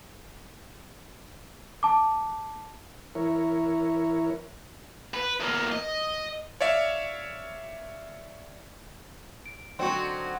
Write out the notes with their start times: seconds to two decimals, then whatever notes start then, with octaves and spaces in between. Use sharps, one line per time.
1.83 A5 D6
3.15 E3 E4 A#4 C#5
5.14 B4
5.40 E2 A#3
5.72 D#5
6.61 C#5 D5 E5 F5
9.46 D7
9.79 D3 F#3 C4 D#4 F#4 C6 C#6